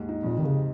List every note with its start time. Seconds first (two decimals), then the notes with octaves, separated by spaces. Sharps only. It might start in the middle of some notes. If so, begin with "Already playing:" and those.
Already playing: D#2 G#2
0.09 D#4
0.23 F2 A#2
0.38 C3 D#3
0.45 C#3